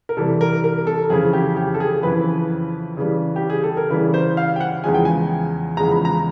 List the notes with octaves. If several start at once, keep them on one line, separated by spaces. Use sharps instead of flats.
A#4
C3 E3 G3 A4
A#4
A#4
A4
F2 C#3 E3 G#4
G4
G4
A4
G#4
F2 C#3 E3 B4
C#3 E3 G3
G4
G#4
A4
A#4
C#3 E3 G3 B4
C5
F5
G5
F#5
E2 C#3 F3 G#3 G#5
G5
G#5
E2 C#3 F3 G#3 A#5
B5
A#5